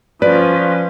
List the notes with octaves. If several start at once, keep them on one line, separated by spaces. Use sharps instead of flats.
F3 C#4 B4 D5